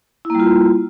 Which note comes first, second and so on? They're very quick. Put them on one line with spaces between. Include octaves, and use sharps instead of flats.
E4 A#3 G3 F4